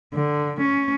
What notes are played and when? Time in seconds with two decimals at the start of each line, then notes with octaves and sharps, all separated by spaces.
0.13 D3
0.62 C#4